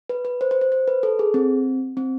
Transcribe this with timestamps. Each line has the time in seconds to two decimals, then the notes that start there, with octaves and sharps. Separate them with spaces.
0.09 B4
0.25 B4
0.41 C5
0.51 C5
0.61 C5
0.72 C5
0.88 B4
1.03 A4
1.19 G#4
1.34 C4
1.97 C4